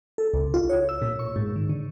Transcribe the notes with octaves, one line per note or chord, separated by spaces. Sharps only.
A4
C#2
F4
C#5
E6
A#2
C#6
G#2
D#3
D3